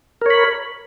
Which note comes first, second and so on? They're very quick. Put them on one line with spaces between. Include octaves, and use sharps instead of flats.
A#4 C#5 B5